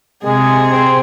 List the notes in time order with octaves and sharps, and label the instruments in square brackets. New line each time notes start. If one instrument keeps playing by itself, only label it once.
[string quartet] C3 G#4 [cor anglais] G#3
[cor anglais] C4